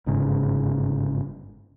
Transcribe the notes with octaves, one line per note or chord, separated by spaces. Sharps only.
G1 G#2 C#3